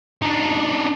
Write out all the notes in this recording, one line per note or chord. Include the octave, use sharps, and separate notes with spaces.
D4 D#4